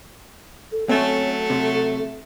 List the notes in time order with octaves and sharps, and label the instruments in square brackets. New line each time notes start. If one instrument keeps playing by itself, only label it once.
[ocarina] A4
[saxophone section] F#3 A3 [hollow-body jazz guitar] C4 C#4 [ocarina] A4
[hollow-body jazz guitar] C3